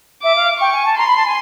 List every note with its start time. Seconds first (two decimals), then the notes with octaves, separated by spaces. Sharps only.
0.22 E5 D6
0.35 F5
0.59 G5 C#6
0.72 G#5
0.85 A5
0.97 A#5 C6
1.06 B5
1.16 A5
1.25 G#5